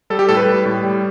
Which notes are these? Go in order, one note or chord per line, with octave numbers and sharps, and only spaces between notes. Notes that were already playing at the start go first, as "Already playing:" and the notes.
G3 A4
G4
A2 A4
B4
G3
A2
G3